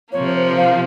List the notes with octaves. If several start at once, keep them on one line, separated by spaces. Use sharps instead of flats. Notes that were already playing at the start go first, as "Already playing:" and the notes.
C3 F3 A#3 C#5
C5
C5
F5